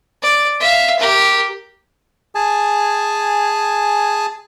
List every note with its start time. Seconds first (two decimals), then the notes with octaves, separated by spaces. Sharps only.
0.23 D5
0.60 E5 F5
0.99 G4 A#4
2.35 G#4 G#5 A5